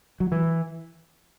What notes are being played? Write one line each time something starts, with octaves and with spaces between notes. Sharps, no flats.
F#3
E3